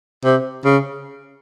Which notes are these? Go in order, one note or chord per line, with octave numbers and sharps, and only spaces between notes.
C3
C#3